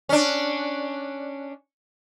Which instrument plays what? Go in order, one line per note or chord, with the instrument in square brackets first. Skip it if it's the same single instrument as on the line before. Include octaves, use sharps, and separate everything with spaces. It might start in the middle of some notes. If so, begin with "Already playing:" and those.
[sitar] C#4 D4